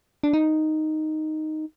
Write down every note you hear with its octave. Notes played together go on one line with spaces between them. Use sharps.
D4
D#4